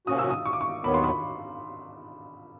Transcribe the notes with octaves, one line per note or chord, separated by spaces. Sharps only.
C3 F3 A#3 C#4 F#4 D#6
E6
D#6
C#6
D6
C#6
D#2 D#3 F#3 B3 B5
C6
B5